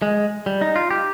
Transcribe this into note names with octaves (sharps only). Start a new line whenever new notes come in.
G#3
G3
D#4
F4
G4